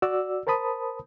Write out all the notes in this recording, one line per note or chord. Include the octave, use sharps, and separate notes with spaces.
F#4 D5 E6
A#4 C5 A5 B5 D#6